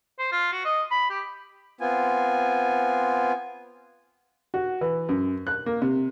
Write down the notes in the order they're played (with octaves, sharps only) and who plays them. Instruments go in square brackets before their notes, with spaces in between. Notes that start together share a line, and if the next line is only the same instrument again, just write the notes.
[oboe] C5
F4
F#4
D#5
B5
G4
[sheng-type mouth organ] B3 C4 F4 G#5
[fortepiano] F#4
E3
F#2
F#6
A#3
C3